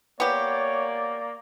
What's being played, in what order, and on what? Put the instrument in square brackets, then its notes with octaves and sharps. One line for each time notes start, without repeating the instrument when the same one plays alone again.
[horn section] A#3 D5 [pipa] B3 G4 [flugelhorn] C#5